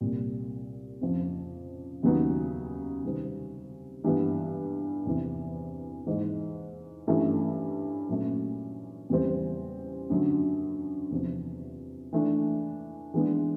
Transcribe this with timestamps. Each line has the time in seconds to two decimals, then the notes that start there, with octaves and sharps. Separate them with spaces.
0.01 C2 A#2 G3
1.01 F2 C#3 F3
2.03 D#2 C#3 F#3 B3 D#4
3.04 C3 D#3 G3 C4
4.04 G2 E3 G3 B3
5.05 E2 C3 E3
6.06 G#2 E3 G#3
7.07 G2 E3 A3 C#4 E4
8.09 A#2 F#3 A3 C#4
9.09 E2 C#3 E3 G3 C4
10.10 F#2 D3 F#3
11.11 E2 C3 F3
12.13 E3 A3 D4
13.14 E3 G#3 B3 D4